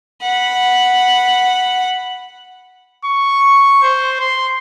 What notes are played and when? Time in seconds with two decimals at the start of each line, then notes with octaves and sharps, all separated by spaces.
0.22 F#5 B5
3.05 C#6
3.83 C5
4.20 C6